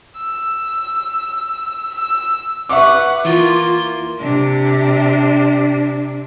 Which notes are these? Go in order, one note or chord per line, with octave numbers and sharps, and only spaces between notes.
E6
E6
B4 E5 F#5 C#6 D6
E3 A#3 F4 C6
C3 D4